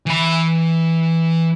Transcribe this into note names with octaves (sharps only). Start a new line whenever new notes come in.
E3 B5